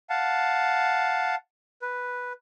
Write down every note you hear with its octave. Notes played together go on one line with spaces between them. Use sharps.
F5 F#5 A5
B4